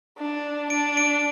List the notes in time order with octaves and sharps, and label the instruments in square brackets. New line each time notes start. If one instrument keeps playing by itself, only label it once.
[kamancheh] D4
[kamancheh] D4 [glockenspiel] D7
[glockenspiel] D7